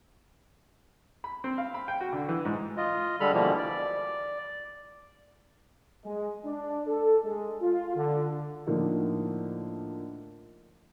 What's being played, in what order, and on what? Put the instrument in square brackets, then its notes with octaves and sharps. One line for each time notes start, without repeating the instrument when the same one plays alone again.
[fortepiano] B5
C4
F5
B5
G5
F#4
D3
E3
G#2
[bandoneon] F4 D#5
D3 G3 G#3 A4 B5 F6
B2 D3 E3 F3 G3 A#3
D5
[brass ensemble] G#3
D4
A4
G#3
F4
D3
[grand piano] A2 D3 F3 A#3 D#4